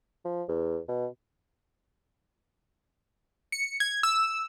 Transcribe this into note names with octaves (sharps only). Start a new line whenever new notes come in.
F3
E2
B2
C#7
G#6
E6